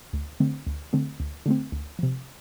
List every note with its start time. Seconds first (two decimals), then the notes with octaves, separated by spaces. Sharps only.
0.13 D2
0.40 D3 A3 C4
0.67 D2
0.93 D3 A3 C4
1.20 D2
1.46 D3 A3 C4
1.72 D2
1.99 C3 F3